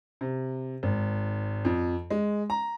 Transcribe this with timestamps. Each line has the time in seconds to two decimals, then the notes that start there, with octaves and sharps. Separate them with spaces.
0.21 C3
0.83 G#1
1.65 F2
2.10 G#3
2.50 A#5